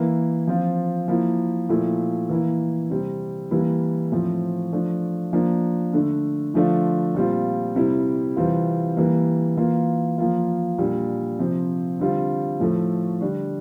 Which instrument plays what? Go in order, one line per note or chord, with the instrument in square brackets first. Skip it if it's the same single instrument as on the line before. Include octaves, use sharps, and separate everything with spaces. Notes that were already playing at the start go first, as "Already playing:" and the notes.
Already playing: [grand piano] E3 A#3 E4
F3 C4 F4
F3 A#3 E4
A#2 F3 A3 E4
E3 A#3 E4
C3 G3 C4
E3 G3 A#3 E4
A2 F3 C4
F3 A3 D4
F3 A#3 D4
D3 A3 D4
D3 F3 A3 D4 F4
A#2 G3 C4 F4
C3 G3 C4 E4
C3 E3 G3 C4 F4
E3 G3 A#3
E3 A#3 F4
F3 A#3 F4
A#2 G3 D4
C3 F3 C4
D3 G3 C4 F4
A2 F3 A3
D3 G3 D4